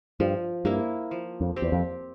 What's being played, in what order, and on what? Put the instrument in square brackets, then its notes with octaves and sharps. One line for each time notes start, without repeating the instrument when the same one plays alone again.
[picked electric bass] G2 [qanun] F3
[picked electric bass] G2 [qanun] A#3 E4
[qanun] F3
[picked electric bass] F2
[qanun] C4 G4
[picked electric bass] E2
F2